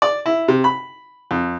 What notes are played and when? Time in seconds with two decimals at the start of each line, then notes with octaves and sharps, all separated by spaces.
0.02 D5
0.26 E4
0.48 C3
0.64 B5
1.31 F2